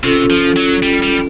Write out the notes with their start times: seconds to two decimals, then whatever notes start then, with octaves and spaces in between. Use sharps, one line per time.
0.04 C3 C#4 F4 A4
0.30 F3
0.56 F#3
0.83 G3
1.02 G3